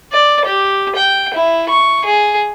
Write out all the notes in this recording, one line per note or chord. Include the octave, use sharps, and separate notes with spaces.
D5
G4
G5
E4
C#6
G#4